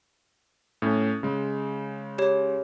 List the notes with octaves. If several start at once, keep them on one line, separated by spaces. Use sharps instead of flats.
A2 C#4
C#3 G#3
G4 C#5